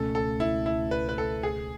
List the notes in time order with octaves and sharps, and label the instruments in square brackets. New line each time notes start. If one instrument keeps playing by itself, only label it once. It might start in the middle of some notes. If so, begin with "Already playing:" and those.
Already playing: [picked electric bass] C#2 B2 A3 C#4 [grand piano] A4
[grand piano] A4
E4
E4
B4
B4
A4
G#4